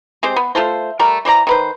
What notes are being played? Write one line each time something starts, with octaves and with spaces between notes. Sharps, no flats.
G#3 C4 G4 C5
B3
A3 F4 A4 C5
G3 A3 A#4 D5
E3 C5 D5 A#5
D#3 B4 C5